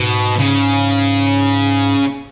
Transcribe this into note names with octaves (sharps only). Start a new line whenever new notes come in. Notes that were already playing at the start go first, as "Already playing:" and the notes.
Already playing: G#2 B2
C#3